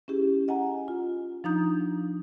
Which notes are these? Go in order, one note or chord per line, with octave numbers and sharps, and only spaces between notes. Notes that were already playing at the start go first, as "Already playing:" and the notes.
C#4 E4 G4 G#4
D#5 F#5 G#5 A#5
F4
F3 D4 D#4 A#5 D#6 G6